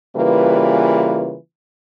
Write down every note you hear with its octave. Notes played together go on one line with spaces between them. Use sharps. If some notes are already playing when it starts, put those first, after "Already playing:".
C#3 E3 G3 A#3 F4 B4